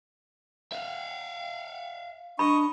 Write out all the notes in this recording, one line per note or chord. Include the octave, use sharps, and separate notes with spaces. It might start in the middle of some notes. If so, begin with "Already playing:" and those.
E5 F5
D4 D#5 B5 C#6